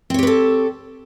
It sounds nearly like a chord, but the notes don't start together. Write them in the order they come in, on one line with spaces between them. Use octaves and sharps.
C4 C#5 G4 B4 A4